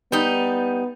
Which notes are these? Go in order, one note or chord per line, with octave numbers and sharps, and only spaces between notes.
G3 B3 D#4